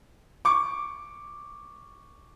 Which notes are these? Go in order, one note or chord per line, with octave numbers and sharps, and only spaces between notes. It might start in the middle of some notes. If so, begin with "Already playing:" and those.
C#6 D6